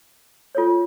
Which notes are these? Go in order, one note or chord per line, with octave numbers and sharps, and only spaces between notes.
F4 A4 C#5